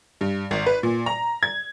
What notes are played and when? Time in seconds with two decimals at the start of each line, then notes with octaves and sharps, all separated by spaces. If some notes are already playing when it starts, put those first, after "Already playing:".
0.21 G2
0.51 G#1
0.66 B4
0.83 A#2
1.06 A#5
1.43 G#6